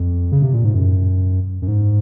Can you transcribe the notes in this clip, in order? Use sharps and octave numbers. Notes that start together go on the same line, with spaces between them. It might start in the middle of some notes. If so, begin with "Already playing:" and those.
Already playing: F2
C#3
C3
A#2
G#2
F#2
F#2
G#2